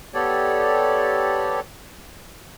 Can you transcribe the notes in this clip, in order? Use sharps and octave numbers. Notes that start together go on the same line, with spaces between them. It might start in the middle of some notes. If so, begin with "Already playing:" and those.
B3 G4 A4 C#5 D5